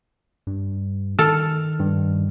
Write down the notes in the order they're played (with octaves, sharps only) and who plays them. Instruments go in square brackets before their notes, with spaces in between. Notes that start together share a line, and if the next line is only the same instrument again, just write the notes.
[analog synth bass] G2
[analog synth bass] D#3 [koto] A4 [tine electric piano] F6
[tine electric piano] G2